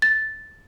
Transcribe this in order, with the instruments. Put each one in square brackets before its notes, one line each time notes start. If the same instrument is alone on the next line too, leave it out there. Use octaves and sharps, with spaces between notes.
[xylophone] A6